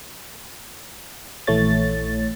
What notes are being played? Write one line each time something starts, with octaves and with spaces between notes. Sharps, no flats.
A#1 E3 A3 C#5 A6